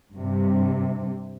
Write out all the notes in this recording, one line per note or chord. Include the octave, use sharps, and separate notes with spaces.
G2 C3